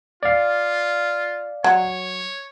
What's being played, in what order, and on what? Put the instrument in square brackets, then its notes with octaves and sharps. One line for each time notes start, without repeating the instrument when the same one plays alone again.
[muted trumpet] F4 [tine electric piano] D5 F5
[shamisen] F#3 [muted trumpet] C#5